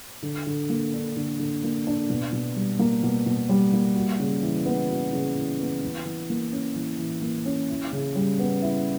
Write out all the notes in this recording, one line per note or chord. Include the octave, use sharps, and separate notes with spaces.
D3
D3
A#3
D4
D3
D3
A#3
D4
B2
B2
G3
A#3
B2
B2
G3
A#3
F#4
C#3
E3
B3
F#4
C#3
E3
B3
E3
E3
A#3
C#4
E3
E3
A#3
C#4
E4
C#3
G3
B3
E4